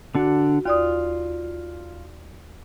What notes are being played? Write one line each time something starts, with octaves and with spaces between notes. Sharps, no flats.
D3 D4 F#4 F#5
D#2 F4 D5 D#6